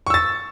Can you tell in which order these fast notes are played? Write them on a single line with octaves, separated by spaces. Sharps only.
C#6 E6 A6